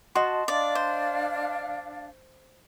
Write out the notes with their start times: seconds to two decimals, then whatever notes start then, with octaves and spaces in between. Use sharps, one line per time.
0.15 F#4 D#5 A5 C6
0.48 D4 D5 F5
0.75 C5